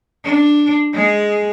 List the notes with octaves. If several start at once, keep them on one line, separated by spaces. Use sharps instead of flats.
D4
G#3 G#4